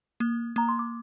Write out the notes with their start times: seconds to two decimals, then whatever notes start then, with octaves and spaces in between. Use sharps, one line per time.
0.20 A#3
0.56 A#3 A#5
0.69 C6
0.79 D6